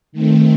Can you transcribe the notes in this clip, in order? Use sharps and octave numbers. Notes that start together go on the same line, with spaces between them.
D#3 A3 C4